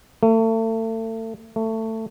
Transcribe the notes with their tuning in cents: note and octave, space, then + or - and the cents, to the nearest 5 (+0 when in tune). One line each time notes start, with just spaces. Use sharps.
A3 +35
A3 +20